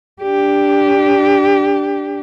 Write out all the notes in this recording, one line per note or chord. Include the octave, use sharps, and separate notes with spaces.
D4 G4